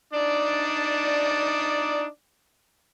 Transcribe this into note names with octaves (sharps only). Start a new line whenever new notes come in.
D4 D#4 D5